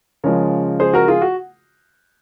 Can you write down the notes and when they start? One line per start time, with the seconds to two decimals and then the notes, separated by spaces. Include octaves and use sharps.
0.24 C#3 F3 G#3 A#4 C#5
0.80 G#4 C5
0.93 F#4 A#4
1.08 F4 G#4
1.22 F#4